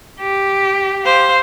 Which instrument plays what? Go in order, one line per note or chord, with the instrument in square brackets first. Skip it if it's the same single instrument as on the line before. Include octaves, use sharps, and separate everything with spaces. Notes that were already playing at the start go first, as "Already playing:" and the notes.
[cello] G4
[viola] C5 F5